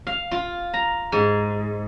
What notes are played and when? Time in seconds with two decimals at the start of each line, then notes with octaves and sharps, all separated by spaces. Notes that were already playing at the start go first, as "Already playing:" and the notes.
0.07 F5
0.31 F4
0.74 A#5
1.12 G#2